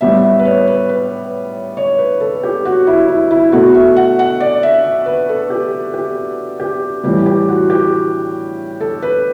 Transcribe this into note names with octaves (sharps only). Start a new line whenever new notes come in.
A2 G3 B3 E5
E5
B4
C#5
B4
B4
C#5
B4
A4
G4
F#4
E4
E4
E4
B2 A3 F#4
E5
F#5
F#5
D5
E5
E5
B4
A4
G4
G4
G4
A2 E3 G3 G4
G4
F#4
G4
A4
B4